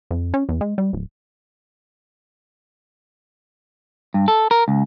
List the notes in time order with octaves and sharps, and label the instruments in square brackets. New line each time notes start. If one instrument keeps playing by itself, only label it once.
[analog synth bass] F2
C#4
E2
G#3
G3
D1
[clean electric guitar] G2
A4
A#4
C#2